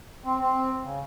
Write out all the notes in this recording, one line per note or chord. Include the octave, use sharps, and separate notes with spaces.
C4
C4
C#3